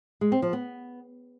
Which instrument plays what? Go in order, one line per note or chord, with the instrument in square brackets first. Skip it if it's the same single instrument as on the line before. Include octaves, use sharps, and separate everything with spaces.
[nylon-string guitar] G#3
C4
F3
B3